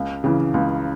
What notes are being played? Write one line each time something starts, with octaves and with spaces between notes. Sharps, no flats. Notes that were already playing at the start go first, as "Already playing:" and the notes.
Already playing: C#2
C#3 E3
C#2